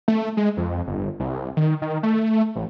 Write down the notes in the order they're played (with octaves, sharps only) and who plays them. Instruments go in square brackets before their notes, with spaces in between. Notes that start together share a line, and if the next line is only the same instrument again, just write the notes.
[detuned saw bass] A3
G#3
F2
G1
C2
D#3
D#3
A3
A1